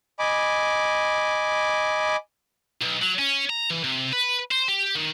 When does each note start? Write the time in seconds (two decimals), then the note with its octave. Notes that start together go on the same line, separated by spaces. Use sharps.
0.19 D#5 G#5 B5 D6
2.82 B1
3.02 F#3
3.19 C#4
3.50 A#5
3.70 E3
3.84 C3
4.13 B4
4.51 C5
4.68 G4
4.95 D#3